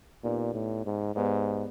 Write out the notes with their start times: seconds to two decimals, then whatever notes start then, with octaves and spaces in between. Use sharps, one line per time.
0.23 A#2 B3 D#4 G4 B4 D5
0.54 A2
0.86 G#2
1.15 G#2 B3 D#4 G4 B4 D5